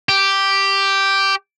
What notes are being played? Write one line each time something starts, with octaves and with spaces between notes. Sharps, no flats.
G4